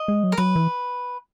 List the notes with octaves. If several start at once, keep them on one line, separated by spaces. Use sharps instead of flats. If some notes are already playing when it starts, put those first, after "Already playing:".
Already playing: D#5
G#3
F#3
A#4
F#3 B4
E3